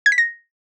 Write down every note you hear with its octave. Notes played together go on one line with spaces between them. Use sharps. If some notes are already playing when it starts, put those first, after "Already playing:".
G#6
B6
A#6